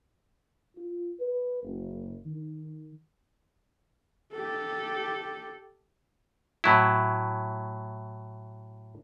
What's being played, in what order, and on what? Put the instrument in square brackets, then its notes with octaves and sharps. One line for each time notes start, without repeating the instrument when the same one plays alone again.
[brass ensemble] F4
B4
F#1
D#3
[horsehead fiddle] G4 A4
[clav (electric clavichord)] A2 F#3 E4